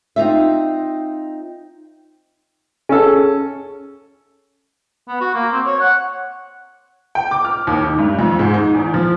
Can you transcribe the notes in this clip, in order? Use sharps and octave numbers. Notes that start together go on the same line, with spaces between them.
C4 D#4 F4 E5
C#4 G#4 A4
B3
F#4
A#3
C4
C#5
F#5
G5
D6
F6
D#2
D#4
G2
F2
G#2
D#4
E2
F3